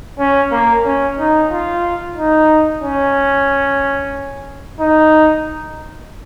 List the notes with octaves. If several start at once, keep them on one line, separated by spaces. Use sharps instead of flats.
C#4
A#3
C#4
D#4
F4
D#4
C#4
D#4